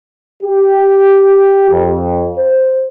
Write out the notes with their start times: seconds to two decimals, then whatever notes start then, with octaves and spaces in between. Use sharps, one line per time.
0.43 G4
1.71 F2
2.37 C5